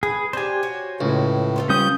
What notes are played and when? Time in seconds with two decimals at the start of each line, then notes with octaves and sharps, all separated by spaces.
0.03 G#4 B4
0.33 D4 G4 C5 G#5
0.63 F#4 C#5
1.01 C#2 A2
1.56 F4 A4 C5
1.69 G3 C#4 D#6 G6